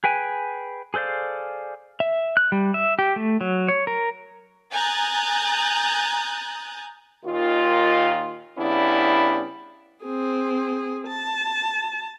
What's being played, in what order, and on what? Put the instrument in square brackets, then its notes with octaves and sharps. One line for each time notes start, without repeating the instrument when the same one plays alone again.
[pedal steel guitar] G#4 B4 G5 G#5
G#4 A4 C5 D5 F5
E5
F#6
G3
E5
G4
A3
F#3
C#5
A#4
[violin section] G#5 A#5 D#6 F#6 G6 A6
[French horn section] D#2 A#2 D#3 F4
C#3 G3 B3 D4 E4
[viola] C4 G#4
A5